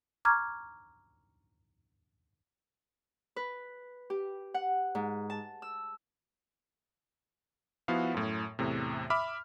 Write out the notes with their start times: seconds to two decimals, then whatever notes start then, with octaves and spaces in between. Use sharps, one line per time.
0.25 A#5 C#6 D6 F6 G#6
3.36 B4
4.10 G4
4.54 F#5
4.95 G#2
5.30 A5
5.62 E6
7.88 F3 B3 E4 F#4 F5
8.14 F#2 A2
8.59 E2 A2 C3
9.10 E5 B5 D6 F6